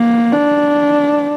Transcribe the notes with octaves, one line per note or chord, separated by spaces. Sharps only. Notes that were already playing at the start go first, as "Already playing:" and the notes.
Already playing: A#3
D4